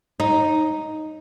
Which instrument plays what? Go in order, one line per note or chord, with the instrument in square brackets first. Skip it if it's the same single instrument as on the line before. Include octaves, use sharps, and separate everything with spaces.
[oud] D#4